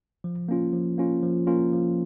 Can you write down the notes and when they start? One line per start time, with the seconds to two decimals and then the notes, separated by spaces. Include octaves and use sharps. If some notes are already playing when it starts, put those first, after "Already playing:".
0.24 F3
0.49 A#3 C#4 F4
0.73 F3
0.98 A#3 C#4 F4
1.23 F3
1.47 A#3 C#4 F4
1.72 F3